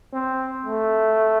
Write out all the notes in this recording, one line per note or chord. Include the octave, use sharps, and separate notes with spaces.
C4
A3